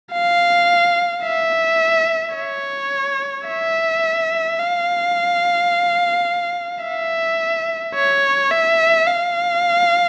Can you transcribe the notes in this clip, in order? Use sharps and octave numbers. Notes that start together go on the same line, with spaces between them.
F5
E5
C#5
E5
F5
E5
C#5
E5
F5